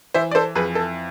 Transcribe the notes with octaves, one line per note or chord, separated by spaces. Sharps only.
E3 C5 E5
D5
A4 C5
F2 G#4 B4
A4